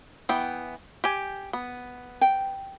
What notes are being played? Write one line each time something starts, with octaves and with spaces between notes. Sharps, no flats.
E3 B3 G5
G4 G#5
B3
G5